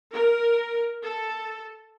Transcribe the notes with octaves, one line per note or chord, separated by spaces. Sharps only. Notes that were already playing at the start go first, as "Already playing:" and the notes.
A#4
A4